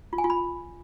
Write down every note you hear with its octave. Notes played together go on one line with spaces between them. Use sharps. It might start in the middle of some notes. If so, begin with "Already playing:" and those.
F4
G#5
F4
B5